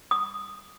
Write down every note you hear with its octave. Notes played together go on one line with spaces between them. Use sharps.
D#6